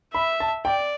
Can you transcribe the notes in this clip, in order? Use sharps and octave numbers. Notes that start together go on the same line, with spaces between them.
E5 B5
A5
D5 G5